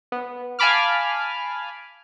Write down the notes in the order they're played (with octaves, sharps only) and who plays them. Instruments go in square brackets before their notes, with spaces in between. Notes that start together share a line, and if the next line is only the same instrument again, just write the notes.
[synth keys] B3
F5 G#5 A5 B5 D6 F6